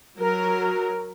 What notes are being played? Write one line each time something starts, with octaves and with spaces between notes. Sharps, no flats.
F#3 A#4